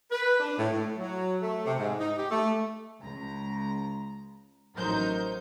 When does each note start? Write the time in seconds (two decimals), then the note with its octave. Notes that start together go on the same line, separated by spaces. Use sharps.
0.12 B4
0.40 D4
0.58 A2
0.72 A2
0.98 F#3
1.42 A3
1.66 C3
1.79 G#2
2.00 D#4
2.17 G4
2.31 A3
3.00 C#2 A#5
4.75 A1 F#3 D#4 A#4 C5 G6